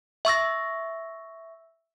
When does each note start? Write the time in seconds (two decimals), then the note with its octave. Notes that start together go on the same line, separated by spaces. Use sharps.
0.25 E5 C#6 E6 A#6